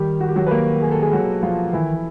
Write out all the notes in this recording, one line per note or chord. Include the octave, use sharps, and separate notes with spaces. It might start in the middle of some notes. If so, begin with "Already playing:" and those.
Already playing: D#3 G3 G4
F#4
G4
F#3 F#4
B4
A#3 A#4
G#4
A4
G#3 G#4
F#3 F#4
F3 F4
D#3 E3 E4